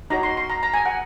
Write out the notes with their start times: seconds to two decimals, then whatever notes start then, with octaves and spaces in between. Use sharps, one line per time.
0.10 D#4 F#4 C#5 A#5
0.23 C6
0.37 C6
0.50 A#5
0.63 A#5
0.74 G#5
0.86 F#5